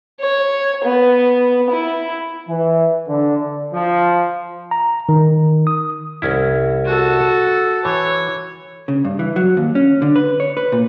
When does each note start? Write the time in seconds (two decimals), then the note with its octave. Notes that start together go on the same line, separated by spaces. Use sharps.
0.21 C#5
0.84 B3
1.71 E4
2.49 E3
3.09 D3
3.73 F3
4.71 A#5
5.09 D#3
5.67 D#6
6.22 C2 C#4 E4
6.85 F#4 A4
7.85 E3 C#5
8.88 C#3
9.05 G2
9.19 E3
9.36 F#3
9.57 D#2
9.75 C#4
10.02 D3
10.16 B4
10.40 C#5
10.57 B4
10.72 A#2